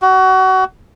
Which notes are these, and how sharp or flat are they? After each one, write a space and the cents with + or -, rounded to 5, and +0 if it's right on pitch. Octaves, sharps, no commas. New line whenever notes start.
F#4 +25